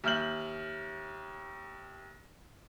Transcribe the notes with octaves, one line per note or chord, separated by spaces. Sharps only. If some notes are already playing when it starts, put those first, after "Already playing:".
D#2 E5 F6 G6 F#7